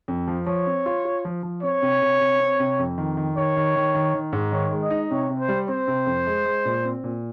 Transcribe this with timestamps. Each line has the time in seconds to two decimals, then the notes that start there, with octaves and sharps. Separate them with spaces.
0.08 F2
0.27 F3
0.46 F3 C#5
0.66 C4
0.86 F4
1.05 F4
1.25 F3
1.43 F3
1.63 C4 C#5
1.82 C3
2.02 C3
2.20 C3
2.40 C4
2.60 C3
2.79 F2
2.98 D#3
3.17 D#3
3.37 D#3 C#5
3.56 D#3
3.76 D#3
3.95 D#3
4.14 D#3
4.33 G#2
4.52 D#3 C#5
4.71 G#3
4.82 D#5
4.90 D#4
5.11 C3 C#5
5.29 C3
5.39 C5
5.49 G3
5.68 C4 C5
5.88 C3
6.07 F2
6.26 G#3
6.46 G#3
6.65 A#2
6.85 C4
7.04 A#2